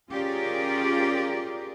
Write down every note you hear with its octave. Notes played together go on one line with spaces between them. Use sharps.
C#4 F4 G4 G#4 A#4 D5